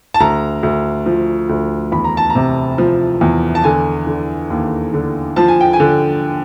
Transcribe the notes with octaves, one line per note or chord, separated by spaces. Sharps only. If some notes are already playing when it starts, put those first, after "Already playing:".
A5
D2 A#5
D2
F3
D2
E2 B5
A#5
A5
A#5
C3
F3
E2
A5
D3 G#5
D3
D#2
D3
F3 A5
G#5
G5
G#5
D3